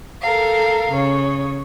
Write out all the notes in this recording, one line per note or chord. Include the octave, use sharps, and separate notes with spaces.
A4 A#4 F5
C#3 C#5